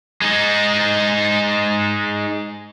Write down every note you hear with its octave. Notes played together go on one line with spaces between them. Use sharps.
G#3 D#4